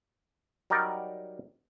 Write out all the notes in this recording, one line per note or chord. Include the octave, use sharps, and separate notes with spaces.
F#3 G3 D#4 A#4 D5